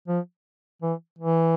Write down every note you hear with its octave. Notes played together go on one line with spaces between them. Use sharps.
F3
E3
E3